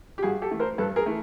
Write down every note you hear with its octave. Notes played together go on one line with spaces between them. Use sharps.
G4
G2 F#4 G#4
G4 A4
E3 A3
A#4 C5
G2 A4 B4
G#4 A#4
E3 A3